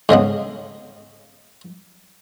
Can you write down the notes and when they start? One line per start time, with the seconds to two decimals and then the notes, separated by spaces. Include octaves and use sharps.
0.09 G#2 C#3 G#3 B3